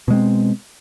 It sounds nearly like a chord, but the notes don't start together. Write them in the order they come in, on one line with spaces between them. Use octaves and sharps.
B2 G#3 C4